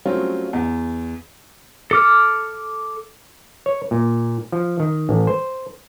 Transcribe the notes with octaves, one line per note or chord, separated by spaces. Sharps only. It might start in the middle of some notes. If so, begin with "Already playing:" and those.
F#3 G3 A3 C4 C#4 F4
E2
A4 D6 F6
C#5
A#2
F3
D#3
A1
C5